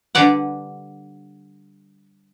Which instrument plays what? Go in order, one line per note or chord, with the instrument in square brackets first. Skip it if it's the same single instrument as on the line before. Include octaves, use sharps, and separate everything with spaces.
[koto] D3 G3 B4 D5 F#5